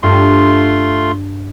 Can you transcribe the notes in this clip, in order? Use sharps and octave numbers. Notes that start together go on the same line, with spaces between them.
G2 A3 F4 C6